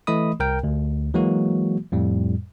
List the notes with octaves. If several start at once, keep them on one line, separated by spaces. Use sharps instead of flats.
E3 A3 D#5 B5 D#6
C2 A#4 G5
D2
E3 F#3 G#3 A#3 F#4
F2 A2 G3